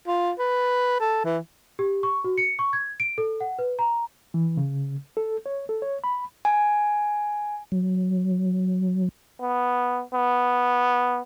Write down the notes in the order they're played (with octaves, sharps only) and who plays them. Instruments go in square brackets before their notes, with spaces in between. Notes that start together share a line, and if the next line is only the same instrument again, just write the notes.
[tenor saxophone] F4
B4
A4
E3
[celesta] G4
C#6
F#4
C#7
C#6
G#6
D7
A4
F#5
B4
A#5
[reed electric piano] E3
C#3
A4
C#5
A4
C#5
B5
[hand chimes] G#5
[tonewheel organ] F#3
[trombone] B3
B3